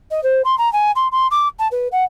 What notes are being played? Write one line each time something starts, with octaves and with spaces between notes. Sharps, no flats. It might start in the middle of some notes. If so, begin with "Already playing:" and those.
D#5
C5
C6
A#5
G#5
C6
C6
D6
A5
B4
F#5